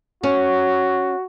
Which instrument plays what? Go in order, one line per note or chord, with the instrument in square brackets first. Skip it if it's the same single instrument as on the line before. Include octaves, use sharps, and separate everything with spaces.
[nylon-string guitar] C#4 [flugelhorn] F#4